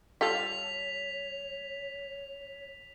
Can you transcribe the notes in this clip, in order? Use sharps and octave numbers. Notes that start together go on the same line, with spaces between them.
G3 F4 A4 C#5 B6 F7